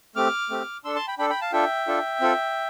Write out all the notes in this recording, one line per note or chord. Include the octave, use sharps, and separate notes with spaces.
A3 C4 G4 D6 F6
A3 C4 G4
D4 A4 C6 E6
A5 C6
G5 B5
D4 A4 G5 B5
G5 B5
F5 A5
D4 F4 A4 E5 G5
D4 F4 A4
C4 F4 A4